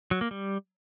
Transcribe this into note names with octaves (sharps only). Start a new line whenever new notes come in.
F#3
A#3
G3